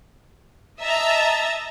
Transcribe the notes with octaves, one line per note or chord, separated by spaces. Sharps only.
D#5 E5 A5 A#5 A6